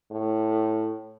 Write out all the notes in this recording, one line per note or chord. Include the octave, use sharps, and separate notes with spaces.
A2